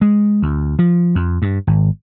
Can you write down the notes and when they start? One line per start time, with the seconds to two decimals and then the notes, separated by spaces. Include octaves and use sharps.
0.01 G#3
0.42 D2
0.79 F3
1.15 F2
1.42 G2
1.67 G#1